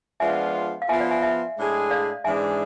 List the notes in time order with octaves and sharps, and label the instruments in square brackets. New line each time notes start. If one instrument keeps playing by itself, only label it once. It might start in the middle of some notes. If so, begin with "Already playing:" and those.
[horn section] F3 G#3 B3 D4 F4 [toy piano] E5 G#5
[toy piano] F5
[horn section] F3 B3 F4 [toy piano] E5 G#5
[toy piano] D5 F5
E5 G#5
E5 G#5
[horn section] A2 G#3 D4 G#4
[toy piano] D5 F5
[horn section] G#2 E3 G#3 D4 G#4 [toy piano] E5 G#5